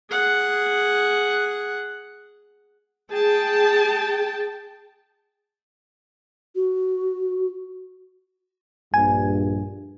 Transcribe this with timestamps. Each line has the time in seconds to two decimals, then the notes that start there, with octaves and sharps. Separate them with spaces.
0.10 G#4 F#5
3.12 G#4 G5 A5
6.55 F#4
8.94 A#1 G2 G#5